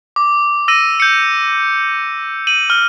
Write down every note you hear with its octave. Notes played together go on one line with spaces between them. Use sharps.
D6
E6 A#6 D#7
G6 C#7
D#7 F#7
F6